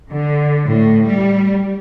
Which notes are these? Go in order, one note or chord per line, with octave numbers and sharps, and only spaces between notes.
D3
A2
G3